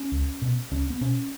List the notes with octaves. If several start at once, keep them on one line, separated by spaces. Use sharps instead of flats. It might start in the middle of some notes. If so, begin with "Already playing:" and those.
Already playing: C#4
C#2
B2
C#2 C#4
B3
B2 C#4